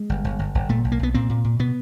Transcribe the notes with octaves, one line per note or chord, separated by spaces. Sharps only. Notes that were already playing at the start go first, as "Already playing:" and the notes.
Already playing: G#3
G1
G1
G1
G1
A#2 A3
B1
A#3
B1 B3
A#2 C4
A#2
A#2
B2 B3